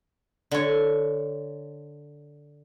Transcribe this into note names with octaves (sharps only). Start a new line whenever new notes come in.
D3 C#5